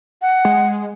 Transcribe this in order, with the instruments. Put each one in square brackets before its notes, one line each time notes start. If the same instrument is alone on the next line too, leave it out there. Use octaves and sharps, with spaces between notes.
[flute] F#5
[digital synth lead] G#3